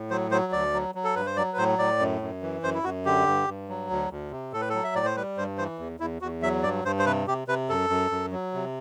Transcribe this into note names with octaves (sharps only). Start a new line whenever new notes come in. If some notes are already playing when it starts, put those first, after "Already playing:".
Already playing: A2
F#3 C5
F#3 C5
D2 D5
F#3
F#3
A4
G2 B4
C5
F#3 D5
B4
A2 C5
A2 D5
F#2
F#2
E3
F#2 C5
E4
F#2 F#4
D3 G4
G2
G2
F#3
D2
D2
C3
A2 A4
B4
F#3 A4
E5
A2 D5
C5
G3 B4
G2 C5
E3 C5
E2
E2 E4
E2 F#4
F#3 E5
G2 D5
G2 C5
C5
C3 B4
C3 G4
C3 B4
F#2 A4
F#2
F#2
F#3
C3